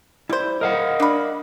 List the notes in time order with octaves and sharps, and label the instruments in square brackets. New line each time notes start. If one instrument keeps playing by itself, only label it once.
[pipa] G3 C5 [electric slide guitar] E4
[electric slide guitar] A#4 F5 F#5 [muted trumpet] D#5
[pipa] D4 B5